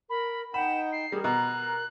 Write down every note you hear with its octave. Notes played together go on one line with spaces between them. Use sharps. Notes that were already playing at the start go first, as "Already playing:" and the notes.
A#4 B5
D#4 F#5 G5 B5 E7
C7
G3 G#4 A#4
B2 A#5 F#6